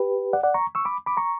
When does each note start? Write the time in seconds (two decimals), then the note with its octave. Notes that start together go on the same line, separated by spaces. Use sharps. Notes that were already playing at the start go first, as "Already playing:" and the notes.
Already playing: G4 B4
0.33 D5 F#5
0.43 D5 F#5
0.54 A#5 C#6
0.75 C#6 E6
0.85 B5 D6
1.06 B5 D6
1.17 A#5 C#6